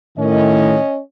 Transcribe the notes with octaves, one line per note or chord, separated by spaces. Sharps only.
A2 D#3 C#4 D#5